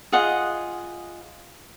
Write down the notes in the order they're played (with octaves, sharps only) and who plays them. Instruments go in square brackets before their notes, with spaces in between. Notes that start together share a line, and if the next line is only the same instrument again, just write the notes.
[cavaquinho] F4 G#4 D#5 F#5